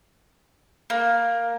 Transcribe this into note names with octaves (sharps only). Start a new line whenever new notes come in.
A#3